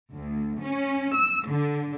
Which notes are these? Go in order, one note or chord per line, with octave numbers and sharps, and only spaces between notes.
D2
C#4
E6
D3